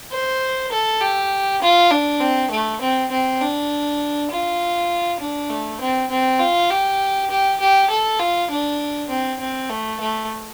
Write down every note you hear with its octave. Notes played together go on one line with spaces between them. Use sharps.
C5
A4
G4
F4
D4
C4
A3
C4
C4
D4
F4
D4
A3
C4
C4
F4
G4
G4
G4
A4
F4
D4
C4
C4
A3
A3